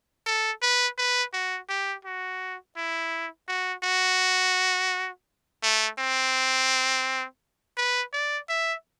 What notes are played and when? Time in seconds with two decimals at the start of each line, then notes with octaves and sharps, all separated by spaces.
0.26 A4
0.62 B4
0.98 B4
1.34 F#4
1.69 G4
2.05 F#4
2.77 E4
3.48 F#4
3.84 F#4
5.63 A3
5.99 C4
7.77 B4
8.13 D5
8.49 E5